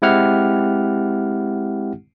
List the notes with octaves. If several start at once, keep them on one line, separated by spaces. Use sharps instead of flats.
G#3 C4 E4 G4 F#5 F6